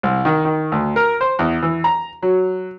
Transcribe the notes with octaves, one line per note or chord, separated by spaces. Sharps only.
C2
D#3
D#3
D2
A#4
C5
E2
E3
A#5
F#3